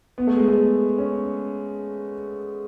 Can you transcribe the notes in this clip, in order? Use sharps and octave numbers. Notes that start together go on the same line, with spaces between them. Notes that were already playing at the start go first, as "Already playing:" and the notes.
B3
A3
G#3
A3
C#4